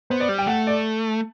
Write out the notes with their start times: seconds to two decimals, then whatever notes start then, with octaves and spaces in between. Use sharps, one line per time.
0.10 B3 C5
0.20 D5
0.29 G3
0.38 G5
0.47 A3 F#5
0.67 D5